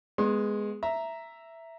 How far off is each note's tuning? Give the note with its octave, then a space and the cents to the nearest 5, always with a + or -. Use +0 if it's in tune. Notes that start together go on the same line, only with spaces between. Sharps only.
G#3 +0 B3 +0 C6 +35
E5 +5 A#5 +0